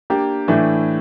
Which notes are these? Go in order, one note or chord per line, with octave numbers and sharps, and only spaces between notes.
A#3 D4 G4
A2 E3 A3 D4